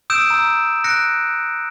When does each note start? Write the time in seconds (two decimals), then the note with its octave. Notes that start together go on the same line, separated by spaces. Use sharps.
0.10 D#6 E6 G6 D7 E7
0.30 A#5 E6
0.84 F#6 A#6 C#7 D7